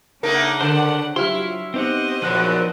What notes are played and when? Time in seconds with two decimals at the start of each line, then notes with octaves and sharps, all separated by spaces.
0.23 C#3 A3 A#3 D4 D#4 A#4 F#5
0.61 D3 C5 D5 A5
1.16 F#3 E4 F4 G4 C5 C6 F6
1.74 B3 C4 D#4 G4 C5 D#5 F#5
2.22 E2 A#2 F3 F#3 B4 F#6